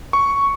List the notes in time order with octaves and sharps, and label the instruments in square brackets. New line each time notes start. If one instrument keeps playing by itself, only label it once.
[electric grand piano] C#6